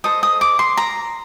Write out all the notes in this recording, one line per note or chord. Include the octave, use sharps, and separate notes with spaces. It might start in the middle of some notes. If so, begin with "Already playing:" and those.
A4 C5 D#5 D#6
D#6
D6
C6
A#5